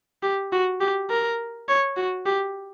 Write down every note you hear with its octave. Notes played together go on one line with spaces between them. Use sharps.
G4
F#4
G4
A#4
C#5
F#4
G4